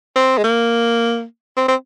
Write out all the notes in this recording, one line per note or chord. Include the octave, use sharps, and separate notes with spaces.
C4
G#3
A#3
C4
C4